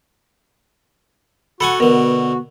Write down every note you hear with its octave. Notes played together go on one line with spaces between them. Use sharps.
F#4 A4 F#5 G#5 B5
B2 D3 B3 A#4